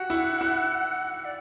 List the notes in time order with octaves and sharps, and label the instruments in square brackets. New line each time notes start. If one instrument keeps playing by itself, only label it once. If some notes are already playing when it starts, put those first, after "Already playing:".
Already playing: [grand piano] F#4 G4 [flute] F#5
[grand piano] E4
E4
[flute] D5